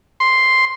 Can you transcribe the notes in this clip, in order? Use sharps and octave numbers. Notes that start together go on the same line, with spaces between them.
C6